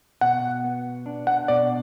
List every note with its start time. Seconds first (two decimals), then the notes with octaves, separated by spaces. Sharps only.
0.21 B2 F#5
0.64 B3
1.06 D4
1.27 F#5
1.48 B2 D5